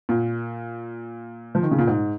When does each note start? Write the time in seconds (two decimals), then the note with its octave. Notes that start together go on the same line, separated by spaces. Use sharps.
0.09 A#2
1.55 F3
1.63 D#3
1.71 C#3
1.79 A#2
1.87 G#2